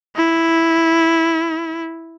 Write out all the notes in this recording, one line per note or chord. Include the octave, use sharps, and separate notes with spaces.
E4